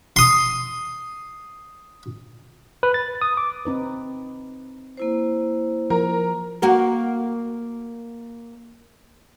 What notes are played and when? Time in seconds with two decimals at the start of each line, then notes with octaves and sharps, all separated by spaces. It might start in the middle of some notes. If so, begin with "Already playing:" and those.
0.16 C6 D#6
2.83 B4
2.94 A6
3.22 D#6
3.37 D6
3.65 C4 D#4 B4
4.97 A#3 E4 C5
5.90 F3 A#4
6.62 A#3 F#4 A#4